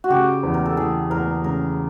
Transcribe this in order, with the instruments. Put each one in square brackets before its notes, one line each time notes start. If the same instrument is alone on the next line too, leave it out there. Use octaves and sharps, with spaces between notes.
[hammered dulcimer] F#4
[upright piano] C#3 [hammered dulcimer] G4
[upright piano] E2
[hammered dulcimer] A#4
A4
[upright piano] E3 [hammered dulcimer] G#4
[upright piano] E2 [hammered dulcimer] A#4
[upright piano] C#3 [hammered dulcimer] A#4